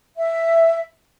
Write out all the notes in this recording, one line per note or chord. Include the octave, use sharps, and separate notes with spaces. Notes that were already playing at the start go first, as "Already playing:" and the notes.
E5